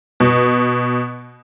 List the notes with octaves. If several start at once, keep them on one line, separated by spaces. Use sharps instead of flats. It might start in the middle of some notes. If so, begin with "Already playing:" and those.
B2